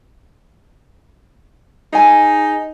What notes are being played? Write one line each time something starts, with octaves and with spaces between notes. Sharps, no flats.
D#4 G#4 G#5